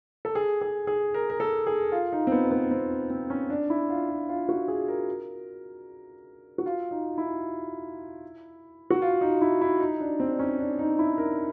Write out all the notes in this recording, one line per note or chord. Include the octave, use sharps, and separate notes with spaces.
A4
G#4
G#4
G#4
A#4
A#4
A4
G#4
F4
D#4
C4
B3
B3
C4
C4
C#4
D4
E4
F4
F4
F4
F#4
G#4
A#4
F#4
F4
D#4
E4
F#4
F4
D#4
E4
E4
D#4
D4
C4
D4
C#4
D4
D#4
E4
A#4